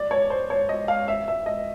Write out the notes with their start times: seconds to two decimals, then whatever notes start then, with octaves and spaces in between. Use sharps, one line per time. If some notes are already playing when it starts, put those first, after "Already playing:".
Already playing: D5
0.11 C#5
0.30 C5
0.50 C#5
0.69 D#5
0.88 F5
1.08 E5
1.28 E5
1.46 D#5